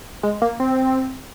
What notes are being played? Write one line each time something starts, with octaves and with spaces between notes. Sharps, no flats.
G#3
A#3
C4